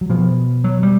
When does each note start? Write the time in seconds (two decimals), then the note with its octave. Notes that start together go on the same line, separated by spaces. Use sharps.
0.01 F#3
0.10 B2 F3
0.64 F#3
0.83 G3